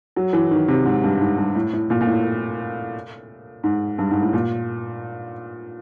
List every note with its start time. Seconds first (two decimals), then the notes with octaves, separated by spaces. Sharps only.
0.16 F#3
0.33 E3
0.51 D#3
0.68 C3
0.85 G#2
1.04 G2
1.21 G#2
1.38 G2
1.55 A2
1.73 A2
1.90 A#2
2.01 A#2
2.07 A2
3.64 G#2
3.98 G2
4.11 G#2
4.23 A2
4.33 A#2